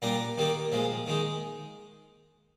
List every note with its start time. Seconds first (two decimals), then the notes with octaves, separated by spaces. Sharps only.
0.02 A#2 G3 D4 A#5
0.38 D#3 G3 A#3 D#4
0.72 A#2 F3 G#3
1.06 D#3 G#3 D#4